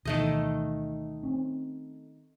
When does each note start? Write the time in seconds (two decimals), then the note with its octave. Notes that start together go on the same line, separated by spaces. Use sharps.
0.05 D2 B2 D#3 E3 A3 D#5
1.23 C4 C#4